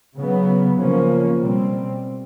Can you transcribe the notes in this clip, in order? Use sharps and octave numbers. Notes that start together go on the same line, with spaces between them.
C#3 F#3 B3
C#3 F3 A#3 C#4
B2 G3 C4